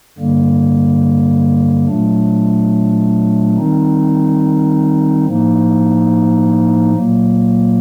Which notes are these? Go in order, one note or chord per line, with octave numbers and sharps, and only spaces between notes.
G2 D3 G3 A#3
A#2 F#3 A3 D4
D#3 G3 C4 D#4
A2 F3 A#3 D#4
A#2 F#3 A#3